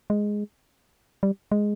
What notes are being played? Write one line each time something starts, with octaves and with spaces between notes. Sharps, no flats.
G#3
G3
G#3